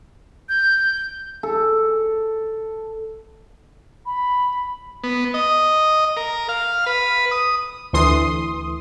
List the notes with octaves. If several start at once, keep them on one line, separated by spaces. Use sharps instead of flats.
G6
A4
B5
B3
D#5
A#4
F5
B4
D#6
D2 E3 C6 D#6